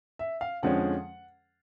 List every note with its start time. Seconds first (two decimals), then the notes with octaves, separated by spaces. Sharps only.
0.19 E5
0.41 F5
0.63 F2 D3 F3 G#3 C#4 F#5